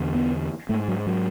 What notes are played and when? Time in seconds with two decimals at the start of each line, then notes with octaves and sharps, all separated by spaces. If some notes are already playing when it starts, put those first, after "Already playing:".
Already playing: E2 D3
0.14 B3
0.69 G#2 A3
0.88 F#3
1.07 F#3